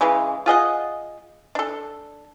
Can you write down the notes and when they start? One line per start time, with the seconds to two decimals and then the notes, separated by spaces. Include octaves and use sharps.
0.01 C#3 E3 G#3
0.46 F4 G#4 D#5 F#5
1.55 D4 A4